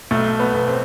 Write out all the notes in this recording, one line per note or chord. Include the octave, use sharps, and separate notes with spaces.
B1 A3
B3
B1
C4